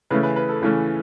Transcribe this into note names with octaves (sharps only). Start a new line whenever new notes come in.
C#3 E3 A3 C#4 B4
B4
B4
A4
C#3 E3 A3 C#4